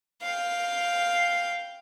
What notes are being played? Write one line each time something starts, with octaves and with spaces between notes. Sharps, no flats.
F5 G5